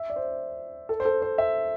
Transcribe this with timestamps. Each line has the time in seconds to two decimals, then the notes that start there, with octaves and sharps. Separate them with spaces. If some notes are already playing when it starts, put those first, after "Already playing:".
Already playing: E5
0.10 D5
0.16 C5
0.89 A4
1.00 C5
1.05 A4
1.22 C5
1.38 E5